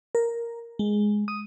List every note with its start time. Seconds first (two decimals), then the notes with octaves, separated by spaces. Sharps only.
0.15 A#4
0.79 G#3
1.28 D#6